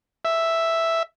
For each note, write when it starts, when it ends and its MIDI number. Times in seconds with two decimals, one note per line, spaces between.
0.25 1.03 76